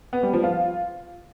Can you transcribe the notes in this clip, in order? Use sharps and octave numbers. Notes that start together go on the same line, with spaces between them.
B3
G3
F3
F4